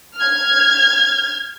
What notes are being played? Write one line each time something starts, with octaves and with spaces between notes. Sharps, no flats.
F6 G#6